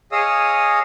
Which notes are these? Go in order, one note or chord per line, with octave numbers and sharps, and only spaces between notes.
G#4 C#5 D#5 F5 D#6 E6